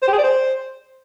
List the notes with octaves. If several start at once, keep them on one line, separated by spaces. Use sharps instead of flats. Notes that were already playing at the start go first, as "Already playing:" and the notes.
C5
G4
G#4
D5
C5